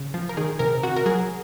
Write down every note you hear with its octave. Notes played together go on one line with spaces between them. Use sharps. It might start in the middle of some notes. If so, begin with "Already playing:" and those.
Already playing: C#3
F3
A#4
D#3 G#4
C3 A#4
C3 F#4
A#4
F#3 G#4